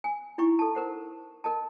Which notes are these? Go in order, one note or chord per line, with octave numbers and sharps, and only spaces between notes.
G#5
D#4 E4 G5 A#5 C#6
A4 A5
A#4 C5 F#5
A#4 D#5 A5